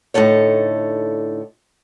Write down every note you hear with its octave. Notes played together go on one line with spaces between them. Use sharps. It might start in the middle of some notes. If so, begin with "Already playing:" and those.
A2 D3 D#4 A4 C#5